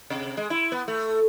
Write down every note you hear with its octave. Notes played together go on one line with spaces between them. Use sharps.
C3
G#3
E4
B3
A3